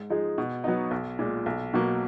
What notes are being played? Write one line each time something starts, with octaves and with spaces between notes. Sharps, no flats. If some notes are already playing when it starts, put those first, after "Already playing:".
Already playing: G#2
F3 G#3 D#4 G#4
B2
F#3 B3 D#4
B1
A#2 G#3
B1
B2 F#3 A#3